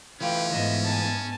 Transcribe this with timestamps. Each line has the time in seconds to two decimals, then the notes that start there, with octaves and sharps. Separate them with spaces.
0.21 E3 A3 C#4 F4 B4 G5
0.52 G#2 B3 D#5 E5
0.85 G#5 A5